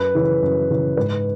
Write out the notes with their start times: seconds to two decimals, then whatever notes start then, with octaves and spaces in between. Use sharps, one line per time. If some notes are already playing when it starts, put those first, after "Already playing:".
Already playing: F#2 B4
0.15 C#3 E3
0.42 F#2
0.70 C#3 E3
0.97 G#2 B4